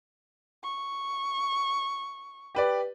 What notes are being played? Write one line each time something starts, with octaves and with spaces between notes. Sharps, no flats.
C#6
G4 B4 D5